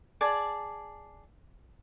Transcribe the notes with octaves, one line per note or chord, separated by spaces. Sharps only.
G#4 D5 A5